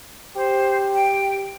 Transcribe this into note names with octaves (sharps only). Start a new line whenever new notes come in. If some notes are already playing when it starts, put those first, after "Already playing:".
G4 C5
G5